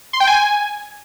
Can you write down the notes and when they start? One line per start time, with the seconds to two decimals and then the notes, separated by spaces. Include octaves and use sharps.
0.13 C6
0.20 G5
0.27 G#5